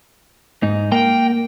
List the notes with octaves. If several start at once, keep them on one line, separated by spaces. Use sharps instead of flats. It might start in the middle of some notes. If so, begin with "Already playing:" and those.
G#2 D#4
A#3 G5